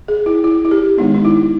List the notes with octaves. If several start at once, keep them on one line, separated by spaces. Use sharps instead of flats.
G#4
E4
E4
E4
G4
D#3 G#3 B3 D#4
D#4
E4